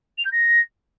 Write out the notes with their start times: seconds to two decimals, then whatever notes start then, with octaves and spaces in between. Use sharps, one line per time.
0.18 F7
0.25 G6
0.32 A#6